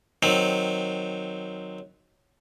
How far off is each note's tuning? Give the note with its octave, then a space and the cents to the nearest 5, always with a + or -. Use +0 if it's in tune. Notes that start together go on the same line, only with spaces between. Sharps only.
D#3 +0 F#3 +0 C4 +0